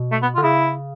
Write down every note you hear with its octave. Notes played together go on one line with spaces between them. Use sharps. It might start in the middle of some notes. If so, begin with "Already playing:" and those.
Already playing: B2
A3
B3
D3 F4
C#3 E4